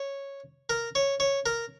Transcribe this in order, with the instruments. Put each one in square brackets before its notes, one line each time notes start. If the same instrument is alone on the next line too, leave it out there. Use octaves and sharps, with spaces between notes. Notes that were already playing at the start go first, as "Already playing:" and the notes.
Already playing: [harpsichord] C#5
A#4
C#5
C#5
A#4